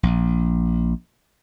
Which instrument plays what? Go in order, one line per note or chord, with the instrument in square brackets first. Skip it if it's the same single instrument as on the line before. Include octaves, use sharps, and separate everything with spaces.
[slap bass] A#1